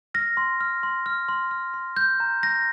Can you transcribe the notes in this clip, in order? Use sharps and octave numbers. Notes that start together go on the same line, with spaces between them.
F6 A#6
C6
F6
C6
F6
C6
F6
C6
G6
A#5
G6 A#6